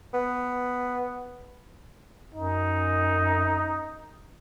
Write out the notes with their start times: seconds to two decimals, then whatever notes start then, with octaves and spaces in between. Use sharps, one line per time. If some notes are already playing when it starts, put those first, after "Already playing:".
0.14 B3
2.34 F#2 D#4